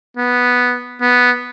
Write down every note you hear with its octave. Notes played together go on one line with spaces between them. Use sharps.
B3
B3